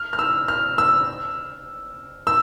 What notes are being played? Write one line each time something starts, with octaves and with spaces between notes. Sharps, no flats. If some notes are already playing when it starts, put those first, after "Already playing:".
Already playing: F6
F6
E6
F6
E6
E6